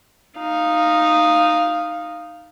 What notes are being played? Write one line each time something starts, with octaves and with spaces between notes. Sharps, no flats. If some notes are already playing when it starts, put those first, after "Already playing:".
D#4 F5